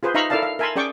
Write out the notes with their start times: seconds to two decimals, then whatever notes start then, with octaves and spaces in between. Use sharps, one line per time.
0.03 F4 G#4 B4 C5
0.14 D#4 E5 F5 A#5 B5 C#6
0.30 E4 A4 A#4 D5 F5 A5
0.43 F5
0.59 A#4 E5 G#5 A5 B5 C6
0.76 C#4 G#4 D5 G5 C#6 D6